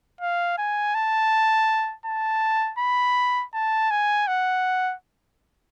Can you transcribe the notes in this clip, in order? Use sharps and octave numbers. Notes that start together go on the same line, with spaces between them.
F5
G#5
A5
A5
B5
A5
G#5
F#5